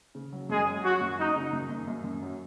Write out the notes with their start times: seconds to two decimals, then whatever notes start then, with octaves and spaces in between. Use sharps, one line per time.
0.15 C#3
0.33 F#3
0.49 F#2 G#3 G#4
0.66 F#3
0.83 F#3 F#4
1.01 F#2
1.19 F#3 D#4
1.36 C#3
1.53 F#2
1.70 F#2
1.87 F#2
2.04 F#2
2.22 F#3